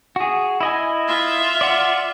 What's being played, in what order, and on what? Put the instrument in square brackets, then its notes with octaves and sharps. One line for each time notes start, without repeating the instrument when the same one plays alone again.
[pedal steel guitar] F#4 G#4
E4 D#5 G#5
[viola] F4 E5
[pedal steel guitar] D5 F#5